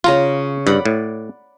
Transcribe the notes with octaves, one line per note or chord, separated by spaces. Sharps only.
C#3 F4 A#5 C#6
G2 D5 F#5 B5
A2